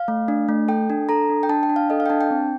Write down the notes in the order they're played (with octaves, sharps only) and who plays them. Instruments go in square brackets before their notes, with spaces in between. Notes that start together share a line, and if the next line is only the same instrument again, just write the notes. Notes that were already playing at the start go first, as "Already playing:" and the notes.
Already playing: [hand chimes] F5
A3
D4
A3
A4 G5
D4
A4 A#5
D4
G5
D4 A5
G5
D4
F5
A4 D#5
F5
G5
D4 A5
G5
C4